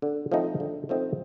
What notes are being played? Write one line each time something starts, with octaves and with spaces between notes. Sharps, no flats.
D3
F3 A3 C4 D#4
D3
F3 A3 C4 D#4